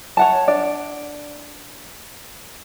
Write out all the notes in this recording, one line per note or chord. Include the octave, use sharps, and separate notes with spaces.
C#5 F#5 A5
D4 D5